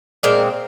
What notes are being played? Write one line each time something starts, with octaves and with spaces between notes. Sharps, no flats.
A#2 G#3 C4 A#4